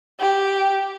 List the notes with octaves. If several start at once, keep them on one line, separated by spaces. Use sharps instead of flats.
G4